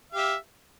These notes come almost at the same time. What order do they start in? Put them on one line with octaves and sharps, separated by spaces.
F5 G4 E5